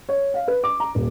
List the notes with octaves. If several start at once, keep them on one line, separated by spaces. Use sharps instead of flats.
C#5
F5
B4
D6
A#5
D#1